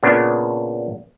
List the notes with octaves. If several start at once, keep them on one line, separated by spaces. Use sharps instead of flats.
A#2 C#3 B3 D4